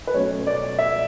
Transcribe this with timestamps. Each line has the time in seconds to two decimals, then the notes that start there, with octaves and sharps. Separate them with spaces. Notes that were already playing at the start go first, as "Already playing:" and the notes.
0.07 B4
0.14 B2 F#3 A3 C#4 C#5
0.47 D5
0.79 E5